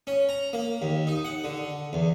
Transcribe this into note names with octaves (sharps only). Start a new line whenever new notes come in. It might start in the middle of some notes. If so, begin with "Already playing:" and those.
C#4
A#5
A#3
D#2
D#4
F#5
D3
E2